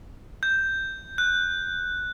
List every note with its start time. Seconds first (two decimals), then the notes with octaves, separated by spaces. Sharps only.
0.43 G6
1.18 F#6